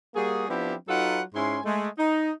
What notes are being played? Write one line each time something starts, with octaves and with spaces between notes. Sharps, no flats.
G3 A#3 F#4 G#4
F3 B3 C4 D4 E4 G4
F#3 D#4 F4 A4 B4 F#5
G#2 C#4 E4 G#5 C6
G#3 A3
D#4